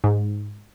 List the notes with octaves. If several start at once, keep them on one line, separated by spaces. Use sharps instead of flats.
G#2